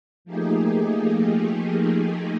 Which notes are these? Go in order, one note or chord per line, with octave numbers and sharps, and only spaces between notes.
F3 A3 A#3 D#4 G4 G#4